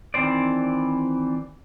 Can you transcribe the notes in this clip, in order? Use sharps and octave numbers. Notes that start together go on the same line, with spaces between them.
D#3 E3 C4 D4 C5 D5